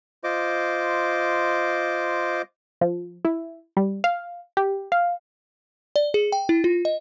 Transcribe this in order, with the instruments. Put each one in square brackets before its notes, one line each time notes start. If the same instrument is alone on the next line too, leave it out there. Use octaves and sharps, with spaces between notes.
[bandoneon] F4 C5 D#5 D6
[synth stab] F3
E4
G3
F5
G4
F5
[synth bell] D5
G#4
G5
E4
F4
D#5